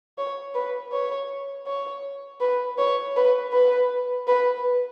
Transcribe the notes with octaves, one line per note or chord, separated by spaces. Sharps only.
C#5
B4
C#5
C#5
B4
C#5
B4
B4
B4